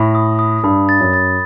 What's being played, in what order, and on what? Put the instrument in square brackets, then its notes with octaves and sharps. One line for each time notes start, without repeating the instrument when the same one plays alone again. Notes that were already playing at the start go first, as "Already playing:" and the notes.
Already playing: [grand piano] A2 [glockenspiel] B5
[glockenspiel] D#6
D#6
[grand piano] G2 [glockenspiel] B5
[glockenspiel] A6
[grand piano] F#2
[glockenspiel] A6